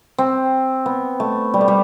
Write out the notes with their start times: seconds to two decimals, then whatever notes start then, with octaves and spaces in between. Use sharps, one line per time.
0.18 C4
0.86 B3
1.20 A3
1.54 G3
1.61 A3
1.68 G3